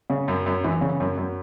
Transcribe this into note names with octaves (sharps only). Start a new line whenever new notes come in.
C#3
F#2
F#2
E3
C#3
F#2
F#2